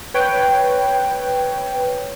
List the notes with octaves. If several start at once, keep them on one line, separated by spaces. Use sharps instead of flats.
B4 C#5 G5